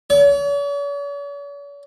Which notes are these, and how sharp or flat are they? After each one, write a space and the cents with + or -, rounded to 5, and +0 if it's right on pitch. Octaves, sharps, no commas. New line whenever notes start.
C#5 +45